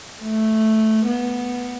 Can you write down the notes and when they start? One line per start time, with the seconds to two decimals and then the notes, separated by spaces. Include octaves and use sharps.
0.22 A3
1.07 B3